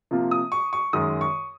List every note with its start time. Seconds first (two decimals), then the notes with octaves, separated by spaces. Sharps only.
0.11 C3 F3 A#3 F4
0.31 D#6
0.52 C#6
0.73 C#6
0.93 F#2 D#3 G#3 D#6
1.21 C#6